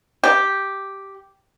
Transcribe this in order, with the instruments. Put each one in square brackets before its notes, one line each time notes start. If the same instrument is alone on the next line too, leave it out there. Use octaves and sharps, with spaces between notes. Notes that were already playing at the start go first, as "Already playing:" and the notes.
[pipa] G4